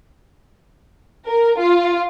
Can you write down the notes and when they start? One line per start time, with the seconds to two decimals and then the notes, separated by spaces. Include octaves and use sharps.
1.26 A#4
1.59 F4